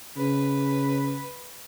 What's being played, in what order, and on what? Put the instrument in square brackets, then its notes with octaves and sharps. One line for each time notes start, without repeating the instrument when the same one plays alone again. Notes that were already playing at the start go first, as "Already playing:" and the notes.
[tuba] C#3 [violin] B4